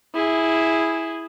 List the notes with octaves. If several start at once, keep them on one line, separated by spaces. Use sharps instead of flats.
E4 G#4